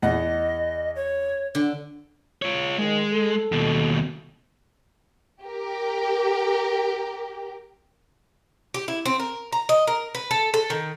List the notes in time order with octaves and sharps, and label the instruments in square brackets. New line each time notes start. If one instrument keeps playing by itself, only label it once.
[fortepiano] E2 F#5 [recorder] D#5
[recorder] C#5
[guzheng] D3
[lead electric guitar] F4 C#5
[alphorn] D#3 [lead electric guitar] G#3
[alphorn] A4
[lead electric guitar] D#2 B2
[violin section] G4 A#4
[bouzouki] G4
E4
C4
A#4
A#5
D#5
A#4
B4
A4
A4
D#3